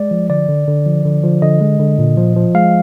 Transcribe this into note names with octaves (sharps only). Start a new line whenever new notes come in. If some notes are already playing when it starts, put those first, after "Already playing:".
Already playing: G#3 D5
F3
D3 D5
D3
D3
F3
D3
F3
D3 D#5
G#3
D3
A#2
F3
F3
G#3 F5